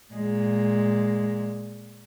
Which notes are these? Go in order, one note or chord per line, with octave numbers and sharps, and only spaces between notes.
A#2 G#3